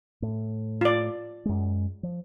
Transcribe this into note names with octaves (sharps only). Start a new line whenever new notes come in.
A2
F4 D5
F#2 G#3
F3